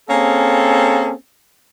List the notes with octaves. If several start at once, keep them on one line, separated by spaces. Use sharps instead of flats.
A#3 C4 C#4 G#4 A4